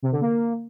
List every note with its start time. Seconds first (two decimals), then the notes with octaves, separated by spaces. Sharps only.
0.02 C3
0.12 D3
0.21 A#3